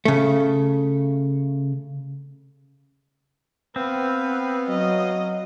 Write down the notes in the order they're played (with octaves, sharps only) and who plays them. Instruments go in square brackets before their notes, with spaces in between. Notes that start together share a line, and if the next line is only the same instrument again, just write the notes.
[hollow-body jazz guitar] C#3 A3
[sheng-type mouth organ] B3 F5 [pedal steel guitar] C4 [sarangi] B4
[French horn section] F#3 [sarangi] D#5